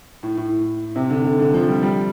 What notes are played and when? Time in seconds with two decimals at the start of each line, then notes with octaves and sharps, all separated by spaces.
0.23 A2
0.37 A2
0.96 C3
1.10 D3
1.24 D3
1.39 D3
1.54 F3
1.68 G3
1.83 G3